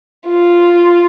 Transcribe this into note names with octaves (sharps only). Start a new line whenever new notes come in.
F4